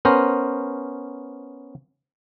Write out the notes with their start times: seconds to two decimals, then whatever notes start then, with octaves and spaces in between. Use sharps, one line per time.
0.05 B3 C#4 A#4 C5